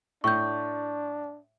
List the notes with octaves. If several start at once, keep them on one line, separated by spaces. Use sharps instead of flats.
A2 D4 C#6 G6